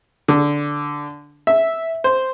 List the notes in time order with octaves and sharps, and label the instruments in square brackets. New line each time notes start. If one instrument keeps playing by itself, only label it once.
[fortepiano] D3
E5
C5